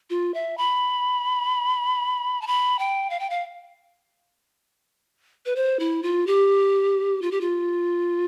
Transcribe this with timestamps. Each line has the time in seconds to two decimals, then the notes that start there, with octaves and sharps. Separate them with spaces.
0.10 F4
0.34 E5
0.58 B5
2.42 A5
2.47 B5
2.79 G5
3.10 F5
3.20 G5
3.30 F5
5.46 B4
5.56 C5
5.79 E4
6.03 F4
6.27 G4
7.22 F4
7.31 G4
7.41 F4